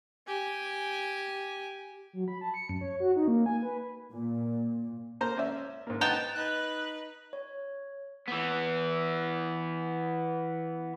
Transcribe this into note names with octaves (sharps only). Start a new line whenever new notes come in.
G4 G#5
F#3
B5
A5
C#7
F#2
C#5
F#4
D#4
A#3
G#5
B4
A#2
A#3 C5 A#5
C#4 D5 E5
G#2 A#3
B3 D#4 G5 A5 A#5
D#4 B4 F#6
C#5
E3 B3